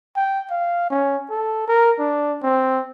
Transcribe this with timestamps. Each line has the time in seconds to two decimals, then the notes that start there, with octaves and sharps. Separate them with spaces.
0.16 G5
0.51 F5
0.90 C#4
1.30 A4
1.68 A#4
1.99 D4
2.43 C4